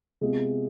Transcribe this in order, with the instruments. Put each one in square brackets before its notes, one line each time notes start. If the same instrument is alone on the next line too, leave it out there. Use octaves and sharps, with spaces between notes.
[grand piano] C3 G#3 B3 F4 G#4